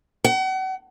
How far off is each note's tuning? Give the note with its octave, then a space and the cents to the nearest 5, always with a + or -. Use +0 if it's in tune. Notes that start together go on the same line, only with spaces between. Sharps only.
F#5 +40